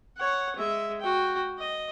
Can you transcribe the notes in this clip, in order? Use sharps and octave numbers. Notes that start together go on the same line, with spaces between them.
C#5 F#5
G#3 E5
F#4 G5
D#5